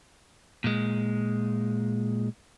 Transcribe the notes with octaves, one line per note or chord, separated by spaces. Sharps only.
A#2 G#3